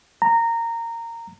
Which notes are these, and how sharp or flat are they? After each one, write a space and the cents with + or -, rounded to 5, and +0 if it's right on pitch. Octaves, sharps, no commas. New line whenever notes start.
A#5 -15